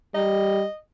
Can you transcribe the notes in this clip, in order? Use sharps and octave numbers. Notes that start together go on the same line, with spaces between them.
G3 D#5